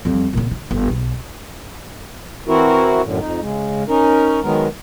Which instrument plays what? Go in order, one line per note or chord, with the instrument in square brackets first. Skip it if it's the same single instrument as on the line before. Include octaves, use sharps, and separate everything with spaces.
[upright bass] F2 G3
A#2 C#3
D3
G1
B1
[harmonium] E3 C4 E4 F#4 A#4
F#2 A2 D3
F2 D#4
C#3 G#3
C#4 D#4 A#4
D#3 F#3 G#3 B3 A#4